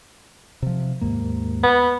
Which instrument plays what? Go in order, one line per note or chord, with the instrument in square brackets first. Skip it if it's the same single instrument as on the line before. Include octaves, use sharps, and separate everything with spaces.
[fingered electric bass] C3 F3
D#2 G#2 A#3
[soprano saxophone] B3